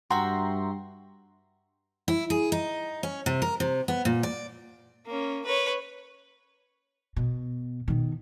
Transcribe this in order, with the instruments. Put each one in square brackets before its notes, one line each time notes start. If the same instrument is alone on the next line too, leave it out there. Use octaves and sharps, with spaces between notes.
[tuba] G2 [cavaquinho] F#4 E5 [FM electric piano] G5 A#5 C6
[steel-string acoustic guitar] E4
G#4
D#4
C#4
C3
A#4
C3
B3
A#2
D5
[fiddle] A#3 C#4
B4 C#5
[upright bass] B2
B2 D#3